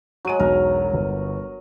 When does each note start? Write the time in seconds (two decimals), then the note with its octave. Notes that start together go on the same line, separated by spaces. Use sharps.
0.25 F#3 G#3 F#4 D#7
0.40 E1 B1 A#4
0.94 G1